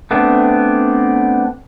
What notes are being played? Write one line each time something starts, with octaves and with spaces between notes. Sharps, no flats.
A3 B3 C4 D4